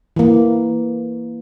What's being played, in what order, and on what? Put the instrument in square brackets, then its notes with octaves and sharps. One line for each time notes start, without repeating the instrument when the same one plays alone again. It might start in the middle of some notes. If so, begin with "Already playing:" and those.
[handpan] E3 A#3